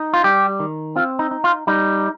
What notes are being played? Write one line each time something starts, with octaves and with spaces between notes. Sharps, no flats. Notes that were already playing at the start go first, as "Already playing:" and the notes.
Already playing: D#4
F4
G3 G4
D#3
C4 F4
D#4
D#4
F4
G3 D#4